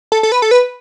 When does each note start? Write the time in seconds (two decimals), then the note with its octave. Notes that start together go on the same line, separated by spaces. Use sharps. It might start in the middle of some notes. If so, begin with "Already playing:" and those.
0.12 A4
0.23 A4
0.32 B4
0.42 A4
0.51 B4